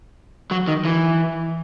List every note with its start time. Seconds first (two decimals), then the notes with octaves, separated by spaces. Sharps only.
0.51 F#3
0.67 D#3
0.85 E3